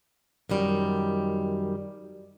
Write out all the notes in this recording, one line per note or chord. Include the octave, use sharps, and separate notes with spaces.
F#2 D#3 G3